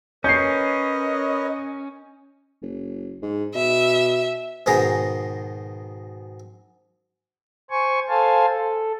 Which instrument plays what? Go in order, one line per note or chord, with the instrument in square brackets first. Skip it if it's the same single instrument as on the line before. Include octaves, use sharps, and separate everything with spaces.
[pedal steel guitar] C#4 [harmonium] A#4 B4 C#5 [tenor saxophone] D#5 [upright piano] G6 C7
[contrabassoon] F#1
G#2
[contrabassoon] B2 [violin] E5
[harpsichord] G#2 B2 D#3 G#4 A#5
[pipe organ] C5 G#5 C#6
A4 C5 F5 G#5 A5
A4